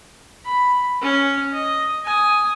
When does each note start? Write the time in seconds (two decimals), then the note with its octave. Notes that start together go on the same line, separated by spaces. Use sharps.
0.46 B5
1.02 C#4
1.53 D#5
2.05 G#5 D#6